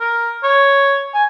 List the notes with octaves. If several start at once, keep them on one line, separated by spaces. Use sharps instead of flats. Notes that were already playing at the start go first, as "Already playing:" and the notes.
A#4
C#5
G#5